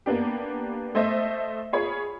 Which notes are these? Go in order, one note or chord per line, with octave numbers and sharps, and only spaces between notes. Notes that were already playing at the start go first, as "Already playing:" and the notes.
A#3 B3 D4 G4
A3 C5 D#5 E5
F4 G#4 C#5 B5